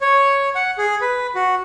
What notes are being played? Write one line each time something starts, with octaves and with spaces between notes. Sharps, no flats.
C#5
F#5
G#4
B4
F#4